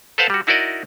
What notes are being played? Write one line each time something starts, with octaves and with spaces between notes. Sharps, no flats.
A4 B4 C5 F5 F#5 A5
G3 F#4
D#4 E4 F#4 A#4 D5 D#5